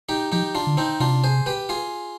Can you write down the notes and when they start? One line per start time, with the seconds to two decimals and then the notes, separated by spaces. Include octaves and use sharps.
0.09 D#4 G4
0.32 F3 D#4 G4
0.55 D4 F4
0.67 D3
0.77 C4 D#4
1.00 C3 D4 F4
1.24 G#4 C5
1.46 G4 B4
1.69 F4 G#4